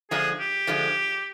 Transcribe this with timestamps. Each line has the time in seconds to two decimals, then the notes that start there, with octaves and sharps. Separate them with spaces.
0.11 D3 F3 G#3 G#4
0.40 G4
0.67 D3 F3 G#3